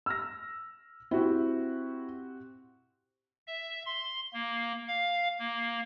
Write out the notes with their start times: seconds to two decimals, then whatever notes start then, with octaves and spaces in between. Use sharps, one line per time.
0.06 E6 F6 A#6
1.11 C4 E4 F#4 G4
3.47 E5
3.86 C6
4.34 A#3
4.88 F5
5.39 A#3